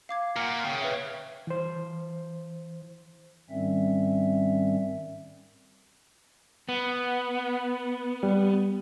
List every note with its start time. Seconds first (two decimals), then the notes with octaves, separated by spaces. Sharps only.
0.09 F5 D6 G#6
0.36 A#2 F#5 F6
0.65 C#3 G5
0.81 B4 E5
1.47 E3 C5
3.50 G#2 D#3 G3 C4 C#4 E5
6.69 B3
8.23 G3